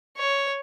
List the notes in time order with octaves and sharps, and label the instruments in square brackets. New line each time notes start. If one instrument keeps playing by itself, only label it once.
[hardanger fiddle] C#5